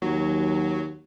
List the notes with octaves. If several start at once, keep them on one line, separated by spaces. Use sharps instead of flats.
D#2 F#3